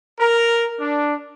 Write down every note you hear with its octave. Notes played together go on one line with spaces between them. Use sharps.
A#4
D4